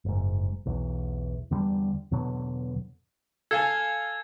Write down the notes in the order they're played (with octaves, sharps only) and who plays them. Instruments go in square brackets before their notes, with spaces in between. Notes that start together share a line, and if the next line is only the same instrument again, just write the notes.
[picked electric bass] F#1 G#2
B1 E2
E2 D3 G3
E2 B2 D3 F#3
[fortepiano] A4 F5 G#5 [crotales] G#6